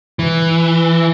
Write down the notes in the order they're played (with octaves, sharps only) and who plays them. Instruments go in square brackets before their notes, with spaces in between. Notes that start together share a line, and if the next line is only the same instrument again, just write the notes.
[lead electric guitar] E3